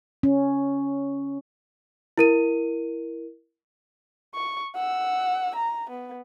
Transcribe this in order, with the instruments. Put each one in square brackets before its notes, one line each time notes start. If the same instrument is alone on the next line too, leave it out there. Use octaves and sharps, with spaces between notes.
[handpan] C#4
[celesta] E4 A#4 D#7
[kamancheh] C#6
F#5 E6
A#5
B3